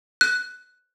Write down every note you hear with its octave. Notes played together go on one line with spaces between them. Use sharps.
F#6